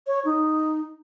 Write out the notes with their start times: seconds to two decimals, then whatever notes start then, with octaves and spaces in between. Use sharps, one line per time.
0.07 C#5
0.25 D#4